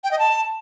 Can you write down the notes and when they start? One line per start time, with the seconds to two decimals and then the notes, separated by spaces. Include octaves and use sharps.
0.04 G5
0.11 D#5
0.19 A5